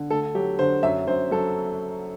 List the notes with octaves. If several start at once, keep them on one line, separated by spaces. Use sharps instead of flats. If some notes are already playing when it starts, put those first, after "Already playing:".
Already playing: D3
D2 A4
F#3 G4
D3 C5
F#2 E5
F#2 C5
F#3 A4